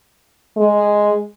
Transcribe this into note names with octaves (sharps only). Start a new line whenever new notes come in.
G#3